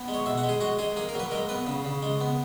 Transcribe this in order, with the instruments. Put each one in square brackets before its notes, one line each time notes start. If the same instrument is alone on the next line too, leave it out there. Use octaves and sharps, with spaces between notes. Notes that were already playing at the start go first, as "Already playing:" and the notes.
Already playing: [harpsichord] B3
G#3
C#5
B2 E5
F#5
G#3
G#4
G#3 F#4
G#3 G#4
A#3 G#4
A#4
F#3 B4
G#3 A#4
B3 B4
C#3
C#3
G#3
B3